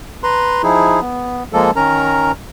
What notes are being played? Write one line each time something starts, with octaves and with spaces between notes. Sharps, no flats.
B4 A#5 C6
F3 D#4 E4 G#4
B3
F3 G#3 A#3 A4
D#3 C#4 A#4 A#5